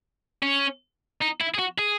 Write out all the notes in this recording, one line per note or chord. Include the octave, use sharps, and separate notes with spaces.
C#4
D#4
E4
G#4
F#4
G#4